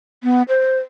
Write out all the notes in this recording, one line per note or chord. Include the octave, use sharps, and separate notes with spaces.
B3
C5